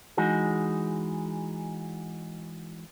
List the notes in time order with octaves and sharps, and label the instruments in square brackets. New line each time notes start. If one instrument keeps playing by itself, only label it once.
[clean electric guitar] E3 G#3 D#4 F#4 G#4